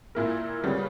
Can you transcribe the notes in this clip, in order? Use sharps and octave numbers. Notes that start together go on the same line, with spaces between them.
A#2 A#3 E4 A#4
C#3 G3 B3